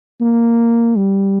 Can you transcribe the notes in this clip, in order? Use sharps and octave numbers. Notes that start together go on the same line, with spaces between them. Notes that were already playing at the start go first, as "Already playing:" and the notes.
A#3
G3